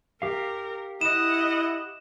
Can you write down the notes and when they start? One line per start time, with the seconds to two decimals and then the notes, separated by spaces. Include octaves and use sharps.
0.22 G4 A#4 F5
1.01 E4 D#5 F#5 E7